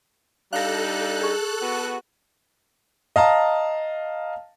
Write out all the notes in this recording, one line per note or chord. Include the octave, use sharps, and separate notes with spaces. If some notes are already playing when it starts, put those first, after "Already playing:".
G3 D4 D#4 A4 F5 F#6 A#6
G#4 C#6
B3 F#4
D#5 F5 A5 A#5